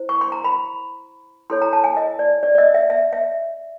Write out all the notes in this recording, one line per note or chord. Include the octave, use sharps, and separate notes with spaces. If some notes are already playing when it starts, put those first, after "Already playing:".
Already playing: E4 C5
C#6
C6
A#5
B5
E4 A4 C#5 C6
A#5
A5
G#5
D#5
D5
D5
D5
D#5
E5
E5
E5